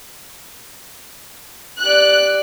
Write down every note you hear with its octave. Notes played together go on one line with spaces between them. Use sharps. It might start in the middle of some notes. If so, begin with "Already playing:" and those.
G4 D5 F#6